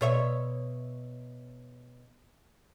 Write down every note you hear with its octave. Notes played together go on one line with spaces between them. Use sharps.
B2 C#5 E5